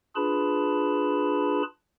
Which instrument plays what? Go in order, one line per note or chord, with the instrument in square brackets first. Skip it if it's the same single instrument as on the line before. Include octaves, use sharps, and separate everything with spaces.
[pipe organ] D4 F4 G#4 B4 A5 B5